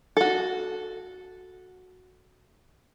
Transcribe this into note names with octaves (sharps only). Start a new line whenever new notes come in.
F#4 A4